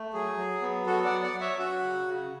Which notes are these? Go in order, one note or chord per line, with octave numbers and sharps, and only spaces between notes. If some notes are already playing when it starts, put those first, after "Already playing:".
Already playing: A3
F#3 G#4
F#3
B3
F#3 F#4 A4
D5 F#5
F#3
D5 F#5
F#3
C#5 E5
C#4 F#4
C#3
C#3